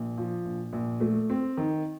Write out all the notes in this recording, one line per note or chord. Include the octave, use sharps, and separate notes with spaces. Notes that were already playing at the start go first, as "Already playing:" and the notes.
Already playing: A#1
F3
A#1
A#1
A3
C4
D#3